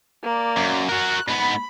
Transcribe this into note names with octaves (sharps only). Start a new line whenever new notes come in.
A#3 D5
F#2
F#4 A#4 F#6
G#2 B3 B5